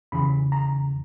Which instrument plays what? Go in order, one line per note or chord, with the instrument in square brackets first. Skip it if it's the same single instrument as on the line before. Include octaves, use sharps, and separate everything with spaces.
[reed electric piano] E2 C#3 E3 B5
A#5